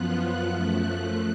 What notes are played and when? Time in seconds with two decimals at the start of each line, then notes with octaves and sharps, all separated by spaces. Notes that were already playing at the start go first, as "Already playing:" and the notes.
Already playing: F#2 F3 B3 F4 F#6
0.50 F#2 F3 A3